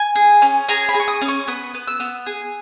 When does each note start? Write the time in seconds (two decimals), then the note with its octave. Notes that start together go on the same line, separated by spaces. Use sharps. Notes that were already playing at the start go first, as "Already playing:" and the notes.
Already playing: G#5
0.16 G#4
0.42 C#4
0.69 G#4 A#5
0.89 B5
0.94 G#4
1.00 C#6
1.08 D#6
1.21 C#4
1.28 C#6
1.47 B3 D#6
1.74 B3
1.88 E6
2.00 B3
2.26 G#4